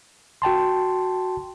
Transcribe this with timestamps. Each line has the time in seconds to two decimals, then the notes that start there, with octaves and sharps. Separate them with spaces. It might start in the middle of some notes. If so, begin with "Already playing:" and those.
0.42 F#4 G5 A5 C6